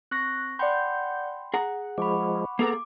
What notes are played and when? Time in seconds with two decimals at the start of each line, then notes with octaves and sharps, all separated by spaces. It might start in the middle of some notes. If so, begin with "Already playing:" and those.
0.11 C4 C#6 F#6 A#6
0.59 D5 F#5 G5 B5 C6 G6
1.54 G#4 F#5 A#5
1.98 F3 G#3 B5 C#6 D6
2.59 A#3 B3 G#4 A4 A#5 D6